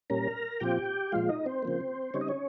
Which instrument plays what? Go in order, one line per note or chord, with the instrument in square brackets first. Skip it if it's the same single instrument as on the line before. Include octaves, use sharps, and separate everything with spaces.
[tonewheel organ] A#2 G3 C#4 A#4 A#5
A#2 F3 C4 F4 G4 G5
A#2 F3 G#3 F4 F5
D#4 D#5
C4 C5
C#3 F3 A#3
C#3 G3 C4 D#4 C#5
D#5
C#4 C#5